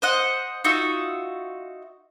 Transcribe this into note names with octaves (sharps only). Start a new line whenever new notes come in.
C5 D#5 F#5
D#4 F4 F#4 E5